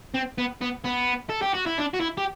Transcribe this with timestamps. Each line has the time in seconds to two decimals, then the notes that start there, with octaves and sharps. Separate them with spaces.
0.14 C4
0.38 B3
0.62 B3
0.85 B3
1.29 A4
1.42 G4
1.54 F#4
1.66 E4
1.78 D4
1.94 F#4
2.00 E4
2.18 G4